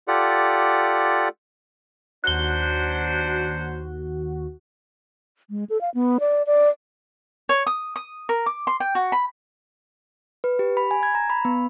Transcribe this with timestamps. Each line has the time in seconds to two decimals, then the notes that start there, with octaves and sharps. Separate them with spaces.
0.08 F4 G4 A4 D5 F#5
2.24 D#2 F#3 D4 F#4 C5 F#6 G7
5.50 G#3
5.70 A4
5.81 F5
5.94 B3
6.20 D5
6.47 D5
7.49 C#5
7.67 D#6
7.96 D#6
8.29 A#4
8.46 D6
8.67 C6
8.80 G5
8.95 F#4
9.12 B5
10.44 B4
10.59 G4
10.77 B5
10.91 G#5
11.03 G#6
11.15 A#5
11.30 B5
11.45 B3